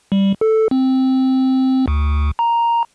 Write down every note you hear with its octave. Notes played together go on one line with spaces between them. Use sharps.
G3
A4
C4
D2
A#5